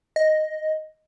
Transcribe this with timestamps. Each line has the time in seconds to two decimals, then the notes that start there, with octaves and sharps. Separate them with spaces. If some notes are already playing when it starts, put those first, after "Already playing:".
0.16 D#5